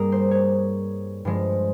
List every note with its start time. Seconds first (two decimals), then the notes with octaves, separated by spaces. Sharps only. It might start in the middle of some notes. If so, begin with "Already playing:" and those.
Already playing: G2 G3 A#3 G#4 A#4
0.12 C5
0.31 C#5
1.25 G2 F3 G#3